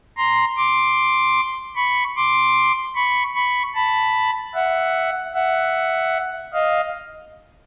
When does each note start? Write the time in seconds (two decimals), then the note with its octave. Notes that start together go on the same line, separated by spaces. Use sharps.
0.17 A#5 C6
0.57 C6 D6
1.76 B5 C#6
2.16 C6 D6
2.95 B5 C#6
3.35 B5 C#6
3.75 A5 B5
4.54 E5 F#5
5.34 E5 F#5
6.53 D#5 F5